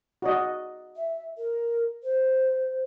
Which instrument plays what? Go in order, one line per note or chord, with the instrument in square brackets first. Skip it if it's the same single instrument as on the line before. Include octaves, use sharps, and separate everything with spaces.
[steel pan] F#4 D5 D#5
[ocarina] E5
A#4
C5